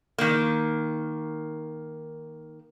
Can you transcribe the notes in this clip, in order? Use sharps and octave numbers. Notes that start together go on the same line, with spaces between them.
D#3 A#3